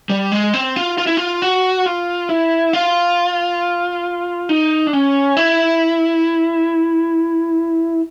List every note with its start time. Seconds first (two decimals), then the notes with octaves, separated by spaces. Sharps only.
0.10 G3
0.32 G#3
0.54 C4
0.76 F4
0.98 F4
1.07 E4
1.17 F4
1.42 F#4
1.86 F4
2.29 E4
2.73 F4
4.49 D#4
4.87 D4
4.93 C#4
5.37 E4